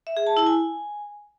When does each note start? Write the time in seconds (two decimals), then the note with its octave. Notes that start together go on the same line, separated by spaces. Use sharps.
0.07 E5
0.17 G#4
0.27 A5
0.37 E4
0.47 G#5